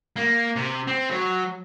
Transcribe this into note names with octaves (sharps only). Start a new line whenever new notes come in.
A#3
C3
C4
F#3